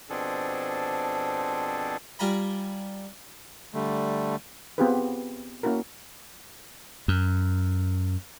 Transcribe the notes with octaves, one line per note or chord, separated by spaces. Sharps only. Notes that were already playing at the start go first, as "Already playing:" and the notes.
B2 F3 C4 D4 G#4 A4
G3 F4 G#5 A#5 B5
D3 G3 A3
B3 C4 F4 G4 G#4 B4
A#3 C#4 E4 F#4 A#4
F#2